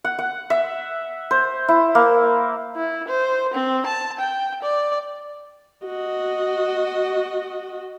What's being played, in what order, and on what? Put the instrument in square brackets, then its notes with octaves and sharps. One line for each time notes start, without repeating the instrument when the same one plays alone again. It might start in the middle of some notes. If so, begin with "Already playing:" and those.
[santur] F#5
F#5
E5
C5
E4
A#3
[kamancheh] E4
C5
C4
A5
G5
D5
[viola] F#4 D#5